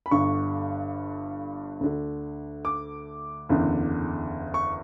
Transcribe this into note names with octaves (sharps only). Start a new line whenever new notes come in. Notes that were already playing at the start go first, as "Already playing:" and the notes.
B5
G1 G2 D3 C#6
D2 D3
D6
F#1 E2 D3
C#6